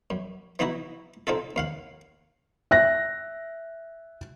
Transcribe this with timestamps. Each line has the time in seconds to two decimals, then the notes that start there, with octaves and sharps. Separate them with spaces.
0.10 F#2
0.59 E3 B3 D#4 E4 F#4
1.27 C4 D#4 F4 A4
1.56 D#2 F5 F#5
2.71 E5 F#6 A#6